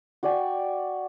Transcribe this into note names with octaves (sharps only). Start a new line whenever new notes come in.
F#4 D5 G5 G#5